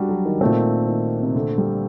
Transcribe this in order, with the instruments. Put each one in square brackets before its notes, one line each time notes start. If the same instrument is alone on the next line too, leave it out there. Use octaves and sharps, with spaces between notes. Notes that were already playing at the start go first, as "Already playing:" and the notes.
Already playing: [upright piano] G3 D4 F#4
F#3
D#3
[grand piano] A#2 A3 C4
[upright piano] D#3
C3
D3
G3